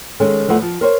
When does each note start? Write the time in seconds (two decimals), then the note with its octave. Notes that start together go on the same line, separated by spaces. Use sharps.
0.20 D#3 G#3 C#4 A4
0.48 E2 F3 A3 B4 F#5
0.62 F3
0.81 A#4 C5 C#5